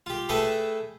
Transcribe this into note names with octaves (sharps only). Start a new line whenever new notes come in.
F4 G4
A3 G#4 A4 B4 G5